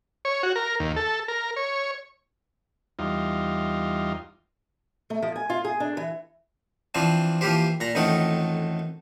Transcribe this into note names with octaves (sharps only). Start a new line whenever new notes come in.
C#5
F#4
A#4
D#2
A4
A#4
C#5
E2 G3 D#4 F4
A3
F3
G#5
F4
G#4
D4
E3
E3 F3 C4 D4
E3 F3 A#3 G4 C5
A#2 A#5
A1 F2 D#3 A3 D#4 F#5